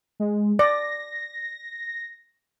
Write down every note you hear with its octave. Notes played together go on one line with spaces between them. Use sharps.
G#3
D5 A#6